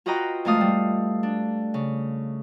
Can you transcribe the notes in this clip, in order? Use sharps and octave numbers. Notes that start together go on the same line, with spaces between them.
F4 F#4 B4 D#5 G5 A#5
F2 G#3 A3 F5 D#6
G3
D4
C#3